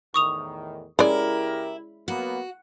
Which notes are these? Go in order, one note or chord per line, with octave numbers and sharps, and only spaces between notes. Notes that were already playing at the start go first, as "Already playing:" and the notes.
E2 A2 D#3 C#6 D#6 F7
C#3 G#3 C#4 E4 G4 A#4 D5
F#3 A#3 B3 F#4